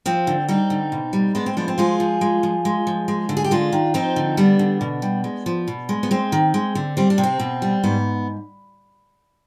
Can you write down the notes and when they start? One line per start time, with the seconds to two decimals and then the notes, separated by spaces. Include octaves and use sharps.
0.06 F3 C4
0.27 D3
0.49 G3 C4 D#4
0.70 D3
0.92 B2
1.13 G3
1.35 G#3 B3 D4
1.46 C4
1.57 F3 B3 D4
1.68 C4
1.78 G#3 F4 G#4
2.00 F3
2.21 G#3
2.43 F3
2.65 G#3
2.87 F3
3.08 G#3
3.29 D3
3.37 G#4
3.44 G4
3.51 G#3 D4 F4
3.72 D#3
3.94 F3 C4 D#4
4.16 D3
4.37 G3 B3 D4
4.59 D3
4.81 B2
5.02 G3
5.24 G#3
5.46 F3
5.68 B2
5.89 G#3
6.03 B3
6.11 G#3 C4
6.32 D#3
6.54 G#3
6.75 D3
6.97 G3 C4
7.10 D4
7.18 C3
7.23 C4
7.40 B2
7.62 G3
7.84 G#2 B3